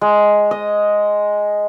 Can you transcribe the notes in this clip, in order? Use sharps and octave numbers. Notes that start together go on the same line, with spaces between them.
G#3
D#5